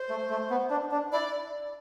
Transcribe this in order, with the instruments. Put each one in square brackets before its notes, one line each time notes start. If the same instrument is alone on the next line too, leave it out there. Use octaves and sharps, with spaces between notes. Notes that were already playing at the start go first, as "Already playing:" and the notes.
Already playing: [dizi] C5
[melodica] A3
A3
B3
D4
D4
[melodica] E4 [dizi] D5